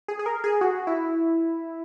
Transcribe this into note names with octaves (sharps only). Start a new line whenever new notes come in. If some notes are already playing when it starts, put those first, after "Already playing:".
G#4
G#4
A#4
G#4
F#4
E4